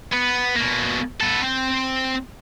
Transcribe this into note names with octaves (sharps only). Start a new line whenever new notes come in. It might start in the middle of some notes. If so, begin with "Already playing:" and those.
B3
B2 A#3
B3 A4
C4 G5